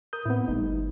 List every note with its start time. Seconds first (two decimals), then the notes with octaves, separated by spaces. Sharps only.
0.13 A#4 D#6 G6
0.26 A2 B3 C4 E4
0.48 G1 G3 A3 D#4